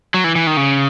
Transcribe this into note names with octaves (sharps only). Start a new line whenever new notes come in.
F#3
E3
E3
D#3
C#3